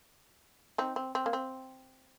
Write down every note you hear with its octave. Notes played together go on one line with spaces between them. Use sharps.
C4 D#4
C4
C4
A#3
C4